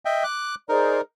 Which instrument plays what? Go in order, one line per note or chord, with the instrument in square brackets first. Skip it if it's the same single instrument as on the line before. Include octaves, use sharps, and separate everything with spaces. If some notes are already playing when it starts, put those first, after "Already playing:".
[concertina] D#5 E5 G5
D6 F#6
[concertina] D#4 A#4 [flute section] G#4 C5 D5